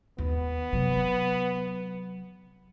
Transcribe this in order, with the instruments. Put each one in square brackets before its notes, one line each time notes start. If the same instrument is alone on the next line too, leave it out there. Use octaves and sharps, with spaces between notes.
[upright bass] D#2 [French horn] B3
[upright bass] C3 F#3